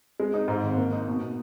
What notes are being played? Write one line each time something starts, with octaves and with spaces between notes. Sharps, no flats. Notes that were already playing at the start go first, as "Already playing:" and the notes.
G#3
D#4
G#2
G#1
A#3
D#4
B2
B2